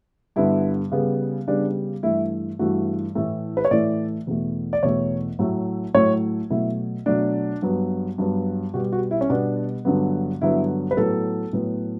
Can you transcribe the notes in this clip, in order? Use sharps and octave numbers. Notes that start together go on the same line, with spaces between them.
G2 D3 G3 B3 E4
C#3 G3 B3
C#3 G3 B3 D4
G2 E3 A3 E4
G2 E3 A3 F#4
A2 E3 A3
B4
C#5
A2 E3 A3 D5
E2 B2 A3
D5
E2 B2 A3 C#5
A2 F#3 A3
A2 F#3 A3 C#5
B2 F#3 A3 E4
B2 F#3 A3 D4
G2 F#3 B3
G2 F#3 B3
B2 G3 B3 F#4
F#4
E4
C#4
B2 G3 B3 D4
G2 D3 F#3 B3
G2 D3 F#3 B3 E4
B4
A2 F#3 B3 A4
A2 F#3 B3